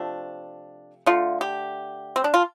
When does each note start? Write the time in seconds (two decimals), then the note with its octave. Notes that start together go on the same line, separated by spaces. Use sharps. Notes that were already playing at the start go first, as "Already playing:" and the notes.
Already playing: C3 F3 A3 D4
1.06 D3 A3 F4
1.41 G4
2.16 C4
2.24 D4
2.34 F4